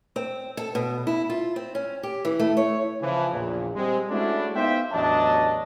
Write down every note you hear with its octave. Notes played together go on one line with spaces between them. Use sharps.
C4
A4
B2
E4
F4
C4
C#4
G4
E3
A3
C#5
C#3 E3 F3
A#1 E2 A#2
G3 G#3 C4
G#3 A3 C#4 D4 E4 F#4
B3 D#4 C5 E5 F5 G5
A1 E2 F#3 D4 D#5 A5